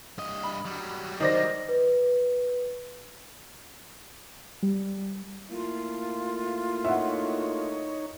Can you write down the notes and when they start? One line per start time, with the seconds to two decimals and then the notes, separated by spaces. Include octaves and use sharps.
0.18 G2 D#5
0.43 B5
0.65 F#3 G3
1.20 D#3 C5 D5 D#5 A#6
1.69 B4
4.63 G3
5.51 A3 A#3 E4 F4
6.85 D#4 C#5 E5 F#5